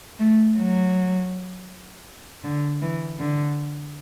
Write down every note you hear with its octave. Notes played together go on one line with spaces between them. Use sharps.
A3
F#3
D3
E3
D3